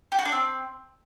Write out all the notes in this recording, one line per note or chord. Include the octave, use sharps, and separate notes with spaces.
G4
F#4
D4
C4